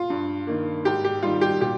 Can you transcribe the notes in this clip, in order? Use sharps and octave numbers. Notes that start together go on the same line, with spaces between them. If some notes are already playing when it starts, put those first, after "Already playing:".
Already playing: F4
G2
D#3 A#3
G#2 G4
G4
D#3 G3 F4
G4
A#2 G4